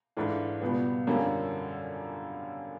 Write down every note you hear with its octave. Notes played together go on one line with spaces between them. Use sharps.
G#2 E3 A3 D4 F4
C#2 B2 G3 B3
F#2 D3 G3 A#3 C#4